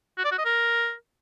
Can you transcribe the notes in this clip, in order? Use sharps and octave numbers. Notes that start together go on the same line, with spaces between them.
F#4
D5
F#4
D#5
A#4